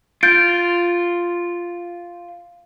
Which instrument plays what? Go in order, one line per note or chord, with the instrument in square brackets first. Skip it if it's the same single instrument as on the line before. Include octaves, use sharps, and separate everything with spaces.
[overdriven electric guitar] F4 [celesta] G6 A6 D7